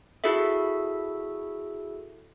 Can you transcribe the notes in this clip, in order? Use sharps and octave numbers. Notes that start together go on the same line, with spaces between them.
E4 F#4 G#4 A4 E5